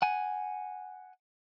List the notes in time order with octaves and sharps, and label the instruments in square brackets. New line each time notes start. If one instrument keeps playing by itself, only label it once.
[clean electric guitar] F#5 G#5